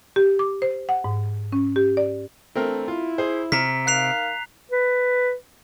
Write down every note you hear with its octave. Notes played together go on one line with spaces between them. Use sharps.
G4
D6
C5
F#5
G#2
C#4
G4
D5
E3 A3 C4 D4 A#4
E4 F4
G#4 C5
C3 A#5 F6 B6
D#4 A#4 F5 F#6 C7 F7
B4